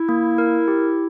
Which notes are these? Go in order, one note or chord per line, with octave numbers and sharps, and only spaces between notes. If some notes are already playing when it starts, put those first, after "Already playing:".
Already playing: E4
A#3
A#4
G4